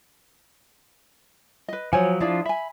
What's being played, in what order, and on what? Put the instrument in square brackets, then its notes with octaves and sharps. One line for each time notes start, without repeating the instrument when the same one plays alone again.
[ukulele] B4 D#5
[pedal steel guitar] F3 F#3 [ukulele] C5 C#5 G#5
[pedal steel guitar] F3 D4 F4 [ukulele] E4 G#4 D5
[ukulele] E5 G#5 [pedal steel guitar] B5